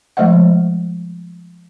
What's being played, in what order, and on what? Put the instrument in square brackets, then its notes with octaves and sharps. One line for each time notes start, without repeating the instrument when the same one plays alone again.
[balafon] F3 G#3 A3 C5 D#5 F#5